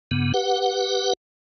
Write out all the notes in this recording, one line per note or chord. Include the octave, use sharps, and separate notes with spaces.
G2 C#3 B3
G4 B4 F#5